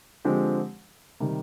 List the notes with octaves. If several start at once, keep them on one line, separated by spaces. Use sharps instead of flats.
D3 F3 G#3 C4 G4
C3 D#3 G3